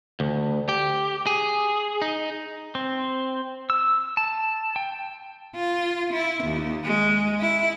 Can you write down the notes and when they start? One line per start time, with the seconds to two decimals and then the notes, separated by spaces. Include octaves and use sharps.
0.20 D2
0.69 G4
1.27 G#4
2.02 D#4
2.75 C4
3.70 E6
4.17 A5
4.76 G5
5.56 F4
6.13 E4
6.44 D#2
6.84 G#3
7.40 E4